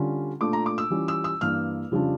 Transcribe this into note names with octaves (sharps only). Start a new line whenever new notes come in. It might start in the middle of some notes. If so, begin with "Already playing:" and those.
Already playing: D3 G3 C#4 F4
A#2 A3 D4 F4 D6
A#5
D6
E6
E3 G3 C#4 F4
E6
E6
G2 E3 A#3 F6
F2 C#3 G3 D4 F4